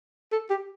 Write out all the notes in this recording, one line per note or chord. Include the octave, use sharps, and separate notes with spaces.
A4
G4